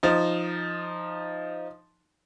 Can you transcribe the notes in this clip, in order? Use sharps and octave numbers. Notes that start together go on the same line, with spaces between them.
F3 D#4